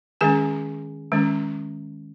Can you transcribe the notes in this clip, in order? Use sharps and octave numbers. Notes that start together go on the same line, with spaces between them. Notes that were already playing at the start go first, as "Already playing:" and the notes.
D#3 G#3 C#4 G#4 G#5
D#3 G#3 C#4